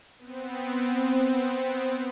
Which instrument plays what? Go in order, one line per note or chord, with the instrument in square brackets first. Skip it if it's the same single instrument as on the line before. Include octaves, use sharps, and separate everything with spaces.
[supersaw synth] B3 C4